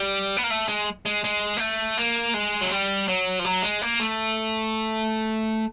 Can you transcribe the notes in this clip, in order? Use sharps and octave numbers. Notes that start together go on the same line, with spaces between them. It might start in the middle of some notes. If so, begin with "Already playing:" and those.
Already playing: G3
B3
A#3
A3
G#3
G#3
G#3
A#3
A3
A#3
G#3
F#3
G3
F#3
F3
F#3
G#3
A#3
A3